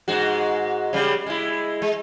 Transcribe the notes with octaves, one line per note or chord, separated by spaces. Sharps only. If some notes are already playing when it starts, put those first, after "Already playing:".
G#2 G#3 F#4
C#3 G3 G#3
G#3 E4
G#3